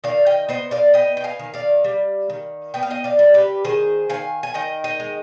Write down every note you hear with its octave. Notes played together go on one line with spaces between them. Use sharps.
D#3 D5 F5
D#5 G5
B3 C5 D#5
D5 F5
B3 D#5 G5
G5
F5 G#5
D#3
D5 F5
G3
D#3
B3 G5
F5
D#5 G5
D5 F5
G3
G4 B4
D#3 G#4 C5
D#3 F5 G#5
G#5
D#3 D#5 G5
D#5 G5
G#3